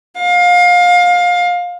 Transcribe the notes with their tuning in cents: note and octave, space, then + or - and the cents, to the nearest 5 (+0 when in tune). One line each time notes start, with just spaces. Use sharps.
F5 +25